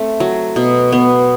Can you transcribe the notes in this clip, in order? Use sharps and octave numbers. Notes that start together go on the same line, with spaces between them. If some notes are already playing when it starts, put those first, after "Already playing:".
Already playing: A3 C4
F#3
B2
B3